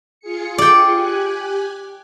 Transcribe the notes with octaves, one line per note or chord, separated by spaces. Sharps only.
F4 G#4 C#7
D5 G5
G4 G#5 F#6